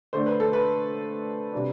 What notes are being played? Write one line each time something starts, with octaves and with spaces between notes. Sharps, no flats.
D3 A3 D4 C5
B4
A4
B4
C3 G3 D4